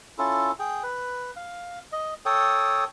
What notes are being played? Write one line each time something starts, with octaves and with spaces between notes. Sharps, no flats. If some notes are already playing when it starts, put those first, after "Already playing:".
C#4 E4 F4 A4
G#4 G5
B4
F5
D#5
A4 C#5 G5 D#6